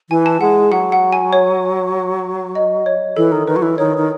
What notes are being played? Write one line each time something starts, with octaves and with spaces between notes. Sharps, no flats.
E3 G#5
A5
G#3 F#5
F#3 F#5
F#5
G#5
C#5
D#5
C#5
E3 A4
D#3
D#3 B4
F#3
E3
D#3 C#5
D#3